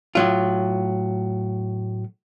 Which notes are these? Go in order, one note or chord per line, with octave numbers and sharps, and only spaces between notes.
A2 F#3 F4